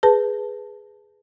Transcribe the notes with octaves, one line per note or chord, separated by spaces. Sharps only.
G#4 B4 A5